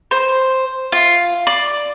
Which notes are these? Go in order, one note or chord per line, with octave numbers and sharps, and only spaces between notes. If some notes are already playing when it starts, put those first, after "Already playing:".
C5
F4
D5